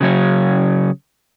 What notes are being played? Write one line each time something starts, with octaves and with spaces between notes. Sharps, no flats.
C#3 F#3 C#4